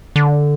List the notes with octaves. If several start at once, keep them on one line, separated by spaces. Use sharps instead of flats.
D3